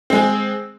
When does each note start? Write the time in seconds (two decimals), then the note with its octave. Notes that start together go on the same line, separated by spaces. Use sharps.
0.10 C4
0.13 G#3
0.15 G#4